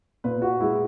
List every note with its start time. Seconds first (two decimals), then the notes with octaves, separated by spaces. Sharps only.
0.24 A#2 B4
0.42 F#4
0.60 G#3 E4